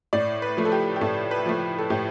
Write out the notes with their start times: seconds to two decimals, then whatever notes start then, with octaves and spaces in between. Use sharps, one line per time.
0.13 A2 D5
0.42 B4
0.57 F3 A3
0.65 A4
0.72 G4
0.96 G4
1.01 A2 A4
1.31 B4
1.46 F3 A3
1.78 A4
1.90 A2 G4